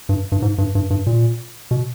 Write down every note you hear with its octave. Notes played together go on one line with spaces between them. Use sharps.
G2
G2
G#2
G2
G2
G2
A#2
B2